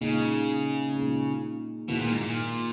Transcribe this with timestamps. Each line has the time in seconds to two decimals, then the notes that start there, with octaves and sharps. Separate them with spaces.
0.01 A#2 C#3 G#3 D#4 G#4
0.94 A#2 G#3 D#4 G#4
1.88 B2 D#3 A#3 E4 G#4
1.99 A#2
2.12 G#2
2.23 A#2